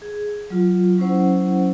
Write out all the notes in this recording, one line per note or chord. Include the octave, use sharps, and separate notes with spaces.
G#4
F#3 F4
F#3 C#4 E4 C5 F#5